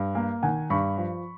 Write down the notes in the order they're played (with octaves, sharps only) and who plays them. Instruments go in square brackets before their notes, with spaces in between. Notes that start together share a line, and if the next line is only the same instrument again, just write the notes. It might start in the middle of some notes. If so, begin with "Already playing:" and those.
Already playing: [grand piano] G2
A#3
D#3 F#5 G#5
G2 B5 C#6
F3